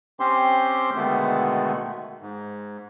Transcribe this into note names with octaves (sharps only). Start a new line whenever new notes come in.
C4 C#4 G4 C5 C6
B2 D3 D#3 G#3 A3 B3
G#2